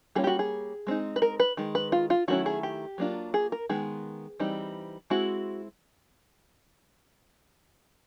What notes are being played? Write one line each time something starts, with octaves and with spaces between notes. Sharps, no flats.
G3 A#3 C#4 F4 G#4
G4
F#4
G#4
G#3 C4 D#4
B4
A#4
B4
D#3 G#3
B4
F4
F4
D#3 F#3 A3 C#4 E4 F#4
G#4
G4
F#3 A#3 D4 F4
G#4
A#4
D#3 G#3 B3 G#4
E3 G3 C4 D#4
G#3 C4 E4 F#4